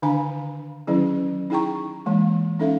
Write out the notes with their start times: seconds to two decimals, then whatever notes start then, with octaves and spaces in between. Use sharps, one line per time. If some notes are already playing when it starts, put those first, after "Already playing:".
0.02 D3 D#3 D4 F5 G#5 A#5
0.87 D#3 F#3 C#4 E4 G#4
1.50 D#4 E4 G#4 G5 A#5 C#6
2.06 E3 G#3 A#3
2.59 C#4 D#4 A4 E5 F5